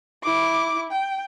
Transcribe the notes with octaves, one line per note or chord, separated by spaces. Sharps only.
E4 D6
G5